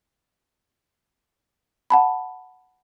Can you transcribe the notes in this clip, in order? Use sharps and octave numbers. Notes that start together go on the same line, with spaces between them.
F#5 A5 B5